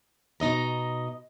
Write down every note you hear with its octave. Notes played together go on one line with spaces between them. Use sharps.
B2 D#4 D#5 A#5